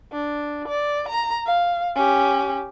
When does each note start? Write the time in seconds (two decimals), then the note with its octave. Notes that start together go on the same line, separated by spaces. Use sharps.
0.12 D4
0.68 D5
1.09 A#5
1.46 F5
1.96 C#4 G4